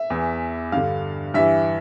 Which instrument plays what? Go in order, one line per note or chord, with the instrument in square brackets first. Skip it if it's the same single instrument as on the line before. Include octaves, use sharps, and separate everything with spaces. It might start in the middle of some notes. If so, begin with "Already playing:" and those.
Already playing: [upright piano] E5
E2 E3
G2 D3 F5
G2 E3 E5